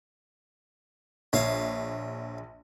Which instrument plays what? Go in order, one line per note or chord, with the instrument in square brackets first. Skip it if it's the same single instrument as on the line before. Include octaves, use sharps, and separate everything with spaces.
[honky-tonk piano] A#1 [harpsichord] C#5 E5 F5